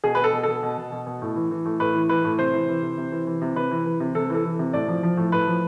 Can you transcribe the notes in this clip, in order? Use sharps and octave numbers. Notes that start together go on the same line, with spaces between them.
B2 G#4
B2 B4
A4
B2
B2 A4
B2
B2
B2
B2
A2
E3
E3
A2
A2 B4
E3
E3 B4
A2
C3 C5
E3
E3
C3
C3
E3
E3
C3
C3 B4
E3
E3
C3
C3 A4
E3 A4
E3
C3
A2 D5
F3
F3
A2
A2 B4
F3